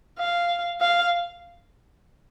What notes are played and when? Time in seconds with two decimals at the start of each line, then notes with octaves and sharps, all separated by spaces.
0.19 F5
0.81 F5